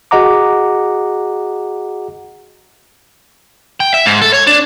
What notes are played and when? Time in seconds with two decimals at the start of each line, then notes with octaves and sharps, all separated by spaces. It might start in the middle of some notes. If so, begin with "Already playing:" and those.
0.11 F#4 G#4 D#5 F#5 A#5 D6
3.80 G5
3.94 E5
4.06 G#2
4.22 A4
4.34 C#5
4.47 D4